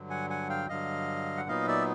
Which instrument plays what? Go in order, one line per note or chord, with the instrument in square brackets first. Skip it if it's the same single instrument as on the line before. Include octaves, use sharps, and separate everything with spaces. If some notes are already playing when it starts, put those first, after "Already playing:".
Already playing: [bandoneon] G2 D3 F#3
F#5 G#5
F#5 G#5
F5 G5
G2 D3 F#3 D#5 F5
F#5
A#2 F#3 B3 D#4 D#5 F5
D5 E5